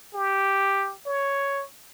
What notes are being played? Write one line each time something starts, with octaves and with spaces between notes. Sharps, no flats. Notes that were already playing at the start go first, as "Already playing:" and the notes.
G4
C#5